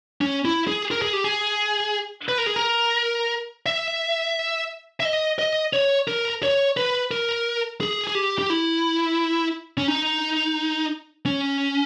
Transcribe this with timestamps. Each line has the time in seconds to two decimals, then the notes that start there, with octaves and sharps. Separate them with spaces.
0.21 C#4
0.45 E4
0.67 G#4
0.91 A#4
1.02 G#4
1.13 G4
1.24 G#4
2.29 B4
2.38 A#4
2.46 G#4
2.56 A#4
3.66 E5
5.00 E5
5.05 D#5
5.39 D#5
5.73 C#5
6.08 A#4
6.43 C#5
6.77 B4
7.11 A#4
7.81 G#4
8.08 G#4
8.15 G4
8.39 G4
8.50 E4
9.78 C#4
9.88 D#4
11.26 C#4